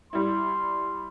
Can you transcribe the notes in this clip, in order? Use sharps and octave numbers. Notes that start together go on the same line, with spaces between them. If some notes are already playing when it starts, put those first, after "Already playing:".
G3 E4 C6